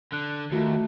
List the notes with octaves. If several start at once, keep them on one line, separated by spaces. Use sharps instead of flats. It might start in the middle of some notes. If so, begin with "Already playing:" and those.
D3 F#6
D#2 A3 F4 F#4